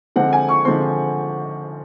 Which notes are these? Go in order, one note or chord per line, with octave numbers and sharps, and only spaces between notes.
D3 F3 G#3 C4 F#5
G#5
C#6
D3 F3 G#3 C4 C6